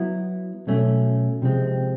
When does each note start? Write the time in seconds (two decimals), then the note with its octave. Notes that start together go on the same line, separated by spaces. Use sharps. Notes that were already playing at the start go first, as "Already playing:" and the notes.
Already playing: F#3 B3 E4
0.67 B2 F#3 A3 C#4
1.42 C3 F3 G#3 C4